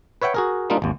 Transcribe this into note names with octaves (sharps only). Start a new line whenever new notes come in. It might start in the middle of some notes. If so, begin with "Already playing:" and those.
B4 C#5 E5 F#5 G5
F#4 G#4 A#4
G3 A#3 D4 D#4 F4
G#1 D#2